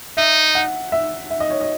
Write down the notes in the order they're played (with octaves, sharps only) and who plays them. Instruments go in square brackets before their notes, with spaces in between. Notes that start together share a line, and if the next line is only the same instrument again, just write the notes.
[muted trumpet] D#4 [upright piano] E5
[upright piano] F#5
E5
E5
D#5
C#5
D#5